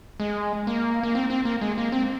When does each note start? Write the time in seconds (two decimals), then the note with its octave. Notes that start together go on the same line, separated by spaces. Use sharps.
0.20 G#3
0.67 A#3
1.03 A#3
1.15 C4
1.30 C4
1.45 A#3
1.61 G#3
1.78 A#3
1.92 C4